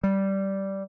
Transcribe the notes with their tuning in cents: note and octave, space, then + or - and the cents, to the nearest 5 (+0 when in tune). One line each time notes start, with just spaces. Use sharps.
G3 -10